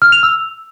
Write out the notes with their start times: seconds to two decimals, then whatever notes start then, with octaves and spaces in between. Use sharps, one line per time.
0.02 F6
0.12 F7
0.23 E6